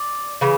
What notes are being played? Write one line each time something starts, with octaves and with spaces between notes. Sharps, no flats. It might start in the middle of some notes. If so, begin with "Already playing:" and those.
Already playing: D5
C#3 E3